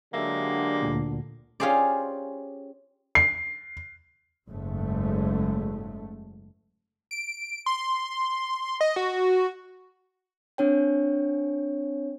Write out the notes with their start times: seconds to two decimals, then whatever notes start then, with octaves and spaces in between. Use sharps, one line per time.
0.14 D3 F#3 G#3 A#3 D4 G4 E5
0.82 D2 A#2
1.60 C#4 F4 G4 G#4 C5 D5
3.15 C7
4.50 F#1 G#2 G#3 A3
7.11 D7
7.66 C6
8.81 D#5
8.96 F#4
10.58 C4 D4 C#5 G5